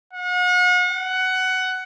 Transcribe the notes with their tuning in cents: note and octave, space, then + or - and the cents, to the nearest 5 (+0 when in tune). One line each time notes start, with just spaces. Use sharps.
F#5 -40
F#5 +15